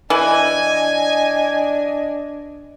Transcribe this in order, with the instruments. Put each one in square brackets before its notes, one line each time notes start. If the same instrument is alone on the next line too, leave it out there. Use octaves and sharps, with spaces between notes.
[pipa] E3 [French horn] D4 [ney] D#5 [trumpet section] G#5